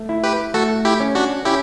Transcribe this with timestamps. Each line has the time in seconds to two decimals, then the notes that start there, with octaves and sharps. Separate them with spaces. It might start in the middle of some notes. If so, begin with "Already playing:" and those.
Already playing: A3
0.09 E4
0.23 G4 B4
0.54 A3 F#4 A4
0.85 E4 G4
1.00 C#4
1.15 D4 F#4
1.45 C#4 E4 G4